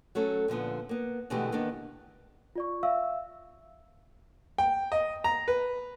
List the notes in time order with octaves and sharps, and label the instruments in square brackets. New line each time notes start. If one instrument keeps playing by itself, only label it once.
[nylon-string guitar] F#3 A3 C#4 A4
A#2 D3 F3 B3
A#3 B3
B2 D3 E3 G#3 A3 G4
D3 D#3 A#3 B3 D4
[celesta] F4 D5 C#6
E5 F5 E6
[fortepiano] G5
D#5
A#5
B4